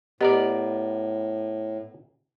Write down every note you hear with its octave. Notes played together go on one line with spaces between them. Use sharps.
A2 B3 G4 A#4 D5 D#5